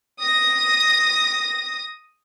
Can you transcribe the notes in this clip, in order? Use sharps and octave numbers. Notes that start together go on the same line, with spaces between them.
D#6 A#6